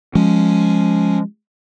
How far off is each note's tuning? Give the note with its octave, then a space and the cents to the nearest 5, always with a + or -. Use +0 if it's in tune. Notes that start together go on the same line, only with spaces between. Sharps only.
F3 +0 G#3 +0 C#4 +0